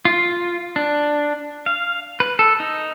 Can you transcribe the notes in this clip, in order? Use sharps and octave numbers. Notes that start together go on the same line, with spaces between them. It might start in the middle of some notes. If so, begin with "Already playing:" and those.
F4
D4
F5
B4
A4
D#4